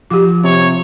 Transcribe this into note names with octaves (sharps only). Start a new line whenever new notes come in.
F3 F#4 G4 D6 E7
C3 C#5